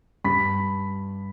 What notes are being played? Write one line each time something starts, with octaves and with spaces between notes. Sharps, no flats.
G2 B5 B6